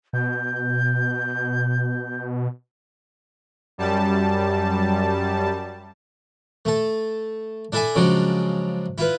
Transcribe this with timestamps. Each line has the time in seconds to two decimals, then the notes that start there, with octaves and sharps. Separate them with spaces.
0.13 B2 G6
3.78 F#2 G3 A5
6.65 A3 A4
7.72 D4 E4 A4 E5 G#5
7.95 C#3 F3 F#3 G#3 D4
8.98 E4 F4 B4